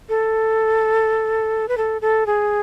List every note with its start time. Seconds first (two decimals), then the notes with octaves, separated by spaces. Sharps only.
0.09 A4
1.68 B4
1.77 A4
2.02 A4
2.26 G#4